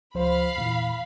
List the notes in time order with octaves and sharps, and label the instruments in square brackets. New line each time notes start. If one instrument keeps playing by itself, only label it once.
[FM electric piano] C#2 F3 C5 [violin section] F5 B5
[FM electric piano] E2 A#2 E3